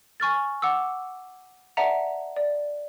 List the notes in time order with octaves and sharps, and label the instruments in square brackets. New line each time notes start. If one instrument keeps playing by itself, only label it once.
[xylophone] G#5 C#6 F6 A6
F#5 D6 E6
D5 E5 F#5 A5 A#5
D5